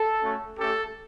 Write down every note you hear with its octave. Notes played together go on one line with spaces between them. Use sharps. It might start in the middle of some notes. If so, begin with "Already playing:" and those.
Already playing: A4
A3 C#4 F#4
A3 C#4 G4 A4